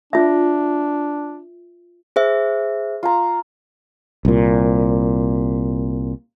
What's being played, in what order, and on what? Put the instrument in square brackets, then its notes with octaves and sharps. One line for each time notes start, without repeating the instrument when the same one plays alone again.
[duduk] D4 [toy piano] F4 E5
[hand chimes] G#4 C5 E5
[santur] F4 A#5
[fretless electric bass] C2 A#2